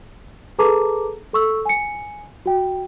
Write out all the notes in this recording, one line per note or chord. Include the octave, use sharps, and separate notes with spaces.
G#4 A4 B4 A5 A#5 D6
A4 C#6 E6
G#5 C#7
F#4 G5